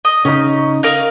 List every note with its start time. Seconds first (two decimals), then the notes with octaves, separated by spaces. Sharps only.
0.05 D#5
0.25 C#3 C#4 D#4
0.83 A#4 D#5 F5